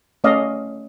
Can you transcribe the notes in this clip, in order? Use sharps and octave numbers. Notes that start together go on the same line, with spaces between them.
A3 C#4 D5 D#5 F5